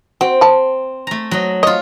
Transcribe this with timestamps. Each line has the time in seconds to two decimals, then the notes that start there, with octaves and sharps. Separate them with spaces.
0.21 C4 F#4
0.41 A5 B5
1.07 A3 A#5
1.31 F#3 D#5
1.63 F4 C#5 D#5